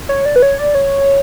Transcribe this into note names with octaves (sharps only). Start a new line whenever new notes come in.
C#5
D5
B4
C#5
D5
C#5